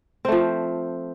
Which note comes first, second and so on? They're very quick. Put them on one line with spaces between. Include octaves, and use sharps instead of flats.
C4 A3 F3